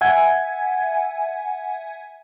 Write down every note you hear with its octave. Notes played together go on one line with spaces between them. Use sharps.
E5 F#5 G#5 G#6